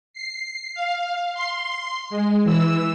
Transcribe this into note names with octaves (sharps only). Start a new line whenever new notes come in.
C7
F5
C6 C7
G#3
E3 E6